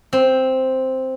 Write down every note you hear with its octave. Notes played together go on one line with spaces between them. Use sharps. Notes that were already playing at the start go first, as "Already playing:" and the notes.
C4